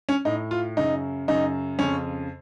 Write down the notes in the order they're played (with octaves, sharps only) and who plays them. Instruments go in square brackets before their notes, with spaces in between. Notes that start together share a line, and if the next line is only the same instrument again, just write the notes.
[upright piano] C#4
A2 D#4
F4
F#2 C#3 D#4
F#2 C#3 D#4
F2 C#3 C#4